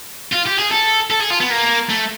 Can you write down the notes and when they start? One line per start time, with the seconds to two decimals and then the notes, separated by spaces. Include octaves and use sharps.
0.32 F4
0.46 G4
0.59 G#4
0.72 A4
1.11 A4
1.20 G#4
1.30 F4
1.40 B3
1.50 A#3
1.90 A3